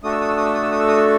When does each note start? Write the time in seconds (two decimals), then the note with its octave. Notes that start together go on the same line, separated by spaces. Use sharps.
0.03 A3 D4 F#4 A4 D#6
0.12 E6
0.21 D#6
0.28 E6
0.37 D#6
0.46 E6
0.54 D#6
0.63 E6
0.72 D#6
0.80 E6
0.88 D#6
0.97 E6